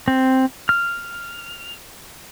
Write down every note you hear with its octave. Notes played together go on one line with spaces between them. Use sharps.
C4
F6